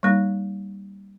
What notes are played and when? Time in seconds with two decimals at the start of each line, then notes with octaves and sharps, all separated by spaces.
0.03 G3 A#3 D#4